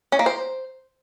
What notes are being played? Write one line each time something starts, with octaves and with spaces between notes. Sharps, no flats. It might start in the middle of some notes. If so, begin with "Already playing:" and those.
C#4
A#3
C5